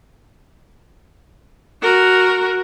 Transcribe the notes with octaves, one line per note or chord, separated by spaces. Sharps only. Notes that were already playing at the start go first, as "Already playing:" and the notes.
F#4 A#4